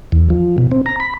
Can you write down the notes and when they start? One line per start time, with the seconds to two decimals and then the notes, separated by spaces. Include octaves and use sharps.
0.12 E2
0.30 F3
0.58 B2
0.71 C4
0.86 A#5
1.00 B5